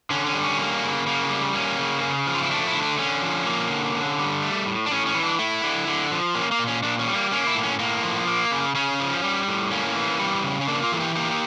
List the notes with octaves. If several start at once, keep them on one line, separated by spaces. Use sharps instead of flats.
D3 C#4
C#4
G3
C#4
A#3
C#3
C#3 A#3
G3
A#3 C#4
C#3
C#3
F3
F4
E4
A3 D4
E4
D3
D4
D3 C#4
F3
A#3
D3
D3
G3
A3
A2
D4
A2 C#4
C#4
E3
D4
A3 E4
D3
D3
F3
A#3 C#4
A#3
A#2
C#4
A#2 D4
C#4
G3
A#3
A#3 C#4
E4
A2
C#4
A2 A#3
F3
A#3
C#3
C#3 C#4
F3
G3
A2
A#3 C#4
E3
G3
C#3
C#4
A#3 D4
F4
E3 A4
G4
A#3 G4